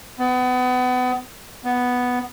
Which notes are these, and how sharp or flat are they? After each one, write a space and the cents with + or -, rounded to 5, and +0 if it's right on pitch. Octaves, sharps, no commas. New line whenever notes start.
B3 +30
B3 +0